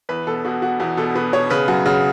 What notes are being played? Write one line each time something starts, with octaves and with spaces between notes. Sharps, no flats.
E2 B4
B2 A4
B2 F#4
B2 F#4
E2 F#4
B2 A4
B2 B4
B2 C#5
C#3 B4
F#2 F#4
C#3 F#4